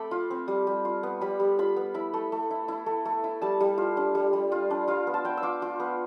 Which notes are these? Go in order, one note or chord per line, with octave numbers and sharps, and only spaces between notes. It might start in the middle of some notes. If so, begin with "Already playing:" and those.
Already playing: A3 C4 B5 D6
F4
C4
G3
G3
F4
B3
G3 B5
G3
F4 B5
B3
E4 B5
A3
A3
E4
E4
A3
A3
E4
G3 A5
G3
F4
D4
G3
G3
F4
D4
F4 F5
B3
A5
B3 G5
E6
F4 D6
F4 D6
B3